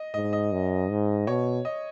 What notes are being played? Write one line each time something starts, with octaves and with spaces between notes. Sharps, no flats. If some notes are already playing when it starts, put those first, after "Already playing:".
Already playing: D#5
G#2 D#5
D#5
F#2
G#2
B2 C#5
D#5